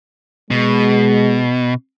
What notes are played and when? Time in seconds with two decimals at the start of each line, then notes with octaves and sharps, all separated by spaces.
0.51 B2 G#3